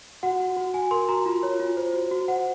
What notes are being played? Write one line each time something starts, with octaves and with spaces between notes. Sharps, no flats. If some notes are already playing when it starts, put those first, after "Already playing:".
F#4 F#5
F#4
F#4
F#4 G#5
A#4 C6
F#4 A#5
F4
C#5
F4
C5
F#4
F#4
C5 F#5